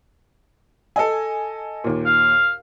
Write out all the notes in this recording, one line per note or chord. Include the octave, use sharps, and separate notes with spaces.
A4 D#5 G#5
D#2 A#2
F5